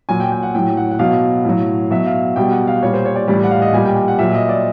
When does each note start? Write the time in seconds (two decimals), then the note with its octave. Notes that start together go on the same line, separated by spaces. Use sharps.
0.09 A#2 F#3 G#5
0.20 G5
0.32 G5
0.43 F#5
0.55 A2 F#3 G5
0.77 F#5
0.91 F#5
0.99 B2 F#3 F5
1.45 A2 F#3
1.91 B2 F#3 E5
2.06 F5
2.36 B2 G3 G5
2.51 F#5
2.68 F5
2.82 A#2 G3 C#5
2.94 C5
3.06 C#5
3.16 D5
3.28 A2 E3 G3 D5
3.43 F#5
3.51 F5
3.62 D#5
3.73 A#2 G3 G#5
3.85 G5
3.96 G5
4.08 F#5
4.19 A#2 F#3 E5
4.35 D#5
4.49 D5